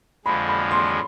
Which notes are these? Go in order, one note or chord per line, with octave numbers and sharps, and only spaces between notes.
F2 D3 F3 G#3 B5
B5
C6